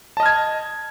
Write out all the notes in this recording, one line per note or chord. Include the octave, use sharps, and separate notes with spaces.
D#5 A5 F6 G#6